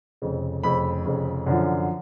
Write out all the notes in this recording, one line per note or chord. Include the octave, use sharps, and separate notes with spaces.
F1 F2 C#3
F1 F2 C#3 B5
F1 F2 C#3
F#2 D3 F3